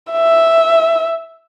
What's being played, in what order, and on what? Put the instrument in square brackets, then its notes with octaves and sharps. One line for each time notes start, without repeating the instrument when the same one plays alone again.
[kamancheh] E5